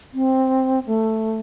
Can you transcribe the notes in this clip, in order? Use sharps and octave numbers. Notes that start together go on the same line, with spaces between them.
C4
A3